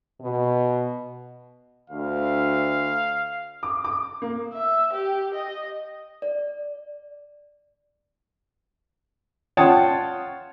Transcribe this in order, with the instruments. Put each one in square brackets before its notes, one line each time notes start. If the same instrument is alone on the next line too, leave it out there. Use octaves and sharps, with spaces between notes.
[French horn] B2
[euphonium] D2 [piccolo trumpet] F5
[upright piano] D6
D6
A#3
[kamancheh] E5
G4
D#5
[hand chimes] D5
[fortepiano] F4 C#5 F#5 G5 A5 D#6